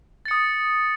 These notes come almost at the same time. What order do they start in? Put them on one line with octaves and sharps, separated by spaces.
A6 C#7 D#6